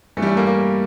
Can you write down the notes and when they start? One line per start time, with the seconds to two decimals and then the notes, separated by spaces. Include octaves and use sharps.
0.17 G2 E3 A3
0.22 G3
0.27 A3
0.37 A#3
0.47 A#3